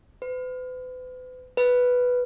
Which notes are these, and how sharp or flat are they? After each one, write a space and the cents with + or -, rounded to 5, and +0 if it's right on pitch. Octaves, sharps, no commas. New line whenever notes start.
B4 +40
B4 +0